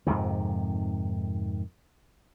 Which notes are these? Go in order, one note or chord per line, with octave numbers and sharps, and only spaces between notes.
F2 G#2 C3 D#3